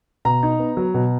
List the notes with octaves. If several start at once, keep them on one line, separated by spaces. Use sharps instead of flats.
B2 A#5
D#4
B3
F#3
B2